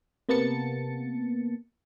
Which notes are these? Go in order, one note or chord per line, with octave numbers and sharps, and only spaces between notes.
C3 A#3 B3 A5 A6 C#7